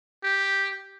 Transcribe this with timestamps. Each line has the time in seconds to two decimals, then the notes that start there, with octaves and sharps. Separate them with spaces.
0.24 G4